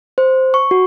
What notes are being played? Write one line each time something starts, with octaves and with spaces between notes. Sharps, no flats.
C5
C#6
F#4